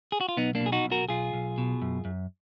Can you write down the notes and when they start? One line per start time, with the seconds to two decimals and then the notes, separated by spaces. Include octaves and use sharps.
0.12 G#4
0.21 F#4
0.29 F4
0.37 B1 B3 D#4
0.55 A#3 D4
0.61 B2
0.66 G#4
0.72 D#4 F#4
0.85 B1
0.92 F#4 A#4
1.09 B1 F4 G#4
1.33 B1
1.58 B2
1.82 F#2
2.05 F#2